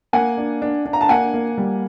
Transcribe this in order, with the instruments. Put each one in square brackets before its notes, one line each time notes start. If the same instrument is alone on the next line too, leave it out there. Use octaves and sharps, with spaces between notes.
[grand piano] A#3 [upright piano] F#5 G#5
[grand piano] D4
D4
D4
[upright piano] A#5
A5
[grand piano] A#3 [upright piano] F#5 G#5
[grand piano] A#3
G3